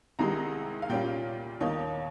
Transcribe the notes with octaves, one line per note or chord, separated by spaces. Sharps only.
C2 C3 D#3 G#3 A#5
F5
A#2 G3 A#3 C#4 F4 G5
D#2 D#3 A#3 D#4 C#5